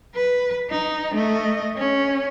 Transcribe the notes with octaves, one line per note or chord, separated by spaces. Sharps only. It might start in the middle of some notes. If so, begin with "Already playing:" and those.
B4
D#4
A3 D#5
C#4